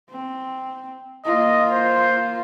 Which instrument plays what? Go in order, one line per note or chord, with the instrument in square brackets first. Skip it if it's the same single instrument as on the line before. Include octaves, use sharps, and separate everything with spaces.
[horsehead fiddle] C4
[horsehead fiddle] A#3 F4 [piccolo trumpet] D#5
[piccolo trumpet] C5